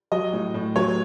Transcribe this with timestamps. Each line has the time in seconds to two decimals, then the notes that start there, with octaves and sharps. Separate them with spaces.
0.12 F#3 D#5
0.33 A2
0.54 A2
0.76 F#3 C#5